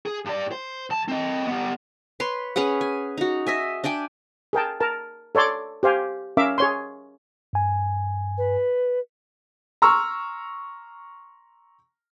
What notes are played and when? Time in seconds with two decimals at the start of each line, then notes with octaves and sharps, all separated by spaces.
0.06 G#4
0.25 G2 D5
0.52 C5
0.90 B1 A5
1.08 C4 D#5
1.47 G3 B3
2.20 B4 C#5 C6
2.56 C#4 G#4 B4 F#5
2.81 G#5
3.18 D#4 F#4
3.47 D#5 E5 G#5
3.84 D4 D5 G5 G#5
4.53 G#4 A#4 G5 A5
4.80 A#4 A5
5.35 A4 C#5 D5 C6 D6
5.83 G4 C5 F5 G#5
6.37 C#4 A#4 E5 F5 D6
6.58 G#4 C#5 C6
7.53 G2 G#5
8.37 B4
9.82 A#5 C6 C#6 E6 F6